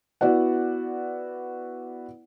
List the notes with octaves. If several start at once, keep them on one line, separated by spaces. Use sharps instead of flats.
B3 E4 F#4 D5 F#5